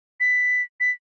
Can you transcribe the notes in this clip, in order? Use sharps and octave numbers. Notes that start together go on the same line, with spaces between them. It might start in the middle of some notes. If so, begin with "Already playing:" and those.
B6
B6